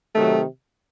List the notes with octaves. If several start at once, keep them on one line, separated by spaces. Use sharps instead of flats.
C3 D#3 F#3 A3